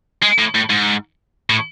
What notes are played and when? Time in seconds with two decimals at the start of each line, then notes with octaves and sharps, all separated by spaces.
0.23 G#3
0.39 A2
0.55 A2
0.70 G#2
1.50 A2